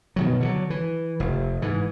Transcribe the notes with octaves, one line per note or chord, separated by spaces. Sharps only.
B2 D#3 F#3
D3 E3 F#3
E3
F1
G#2 E3